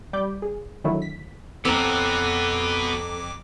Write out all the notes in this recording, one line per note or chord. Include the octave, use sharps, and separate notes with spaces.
G3 D5 B5 D6 G6
G#4
D3 D#3 F#3 A3 E4
B6
F2 B3 C4 F#4 A4 A#5 D6